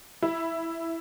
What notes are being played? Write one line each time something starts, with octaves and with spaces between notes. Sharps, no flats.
E4